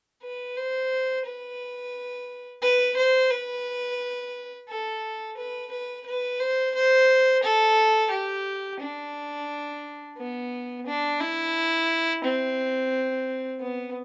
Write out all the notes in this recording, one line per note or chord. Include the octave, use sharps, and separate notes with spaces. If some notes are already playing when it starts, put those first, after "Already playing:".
B4
C5
B4
B4
C5
B4
A4
B4
B4
B4
C5
C5
A4
G4
D4
B3
D4
E4
C4
B3